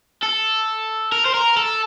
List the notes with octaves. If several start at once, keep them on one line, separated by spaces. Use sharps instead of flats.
A4
A#4
C5
A#4
A4